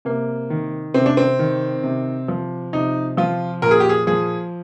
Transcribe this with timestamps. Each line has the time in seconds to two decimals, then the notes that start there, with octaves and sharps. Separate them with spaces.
0.05 C3 A#3
0.50 D#3
0.94 C3 C4
1.06 D4
1.17 C4
1.39 D#3
1.84 C3
2.28 F3
2.73 C3 D#4
3.17 F3 F4
3.62 A#2 A#4
3.71 G#4
3.80 G4
3.89 G#4
4.07 F3 G#4